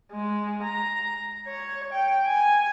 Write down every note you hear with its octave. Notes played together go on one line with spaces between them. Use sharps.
G#3
A#5
C#5
G5
G#5